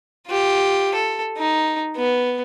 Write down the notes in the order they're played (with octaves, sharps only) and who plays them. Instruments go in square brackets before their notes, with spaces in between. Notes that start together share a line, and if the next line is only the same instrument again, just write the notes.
[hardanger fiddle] F4 G4
A4
D#4
B3